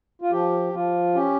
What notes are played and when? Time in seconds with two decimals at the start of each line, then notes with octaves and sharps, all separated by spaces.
0.22 F4
0.31 F3 G4
0.73 F3 F4
1.15 C#4 G4